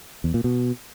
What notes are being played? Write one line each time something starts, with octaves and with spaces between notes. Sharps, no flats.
E2
A#2
B2